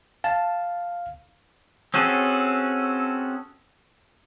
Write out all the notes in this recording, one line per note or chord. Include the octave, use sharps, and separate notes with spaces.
F5 A5
C4 C#4 F#4 G#4 A4